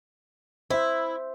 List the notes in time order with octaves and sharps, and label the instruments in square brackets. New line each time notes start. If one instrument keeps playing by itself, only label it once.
[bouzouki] E4 [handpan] C5 E5